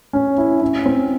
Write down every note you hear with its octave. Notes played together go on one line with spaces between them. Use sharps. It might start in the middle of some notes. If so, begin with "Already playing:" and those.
C#4
E4
C#4
C4